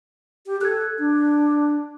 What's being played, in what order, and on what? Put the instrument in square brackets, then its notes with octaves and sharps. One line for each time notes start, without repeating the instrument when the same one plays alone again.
[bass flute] G4
[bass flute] A4 [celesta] F#6 G#6
[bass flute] D4